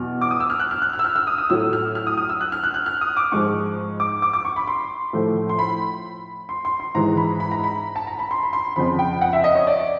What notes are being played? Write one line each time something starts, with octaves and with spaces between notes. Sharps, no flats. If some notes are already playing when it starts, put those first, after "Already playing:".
Already playing: E2 B2 F#3 F6
D6
D#6
E6
F6
F#6
F6
F#6
F6
E6
F6
E6
D#6
D#6
A2 F#3 A3 E6
F6
F6
D#6
D#6
E6
F#6
F6
F#6
F#6
F6
D#6
D6
G#2 F3 G#3 C#6
D6
D6
D6
C#6
B5
C6
A2 F3 A3
C6
B5
C6
C6
C6
G#2 E3 G#3 A#5
B5
B5
A#5
B5
A5
A#5
B5
C6
B5
C6
F2 C#3 F3 B5
G5
F#5
E5
D#5
C#5
D5